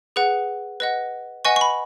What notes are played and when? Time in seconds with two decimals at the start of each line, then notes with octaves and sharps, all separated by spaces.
0.16 G#4 B4 F#5
0.80 B4 D#5 F#5
1.45 B4 D#5 F#5 G#5 C#6
1.56 C#6
1.61 B5